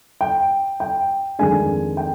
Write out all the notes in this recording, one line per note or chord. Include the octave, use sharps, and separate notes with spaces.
G5
G5
F2 D#3 G#3 D4 G#5
G5